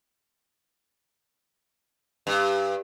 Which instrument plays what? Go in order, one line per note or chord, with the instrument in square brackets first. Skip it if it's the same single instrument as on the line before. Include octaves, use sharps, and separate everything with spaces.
[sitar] G2